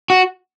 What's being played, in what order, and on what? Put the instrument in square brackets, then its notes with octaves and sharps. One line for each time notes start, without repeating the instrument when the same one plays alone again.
[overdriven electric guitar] F#4